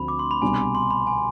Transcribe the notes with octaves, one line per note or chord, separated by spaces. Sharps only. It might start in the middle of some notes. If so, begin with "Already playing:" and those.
Already playing: D2 D3 F3 C4 B5
D6
C6
B5
C2 B2 G3 D4 G#5
C6
B5
G#5